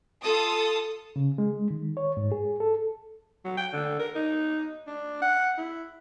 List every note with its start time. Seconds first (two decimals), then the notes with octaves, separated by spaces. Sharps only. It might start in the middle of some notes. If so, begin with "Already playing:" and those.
0.22 F4 A4 D#6
1.16 C#3
1.38 G#3
1.71 D#3
1.97 C#5
2.17 G#2
2.32 G#4
2.60 A4
3.45 F#3
3.57 G5
3.73 D3
3.99 A#4
4.15 D#4
4.87 D4
5.22 F#5
5.58 E4